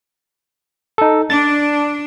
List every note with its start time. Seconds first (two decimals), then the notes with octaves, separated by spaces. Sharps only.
0.98 D#4 A4
1.30 D4 A6